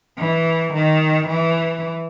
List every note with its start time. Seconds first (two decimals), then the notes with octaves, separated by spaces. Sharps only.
0.18 E3
0.73 D#3
1.27 E3